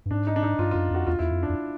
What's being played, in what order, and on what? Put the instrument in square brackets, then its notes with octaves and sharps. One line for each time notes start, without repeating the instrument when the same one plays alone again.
[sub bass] G2
[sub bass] G#2 [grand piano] D4
[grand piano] D#4
D4
D#4
[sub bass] G2 [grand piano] F4
[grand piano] F4
[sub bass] F#2
[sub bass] F2 [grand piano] F#4
[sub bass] E2 [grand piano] F4
[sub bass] E2 [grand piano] E4
[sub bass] F2
[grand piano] D4
[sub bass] F2